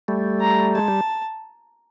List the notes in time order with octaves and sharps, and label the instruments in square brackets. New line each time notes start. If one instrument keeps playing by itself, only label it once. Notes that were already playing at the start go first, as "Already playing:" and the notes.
[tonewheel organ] G3 A3
[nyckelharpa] A#5
[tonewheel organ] G#3 [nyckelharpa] A5
[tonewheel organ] G3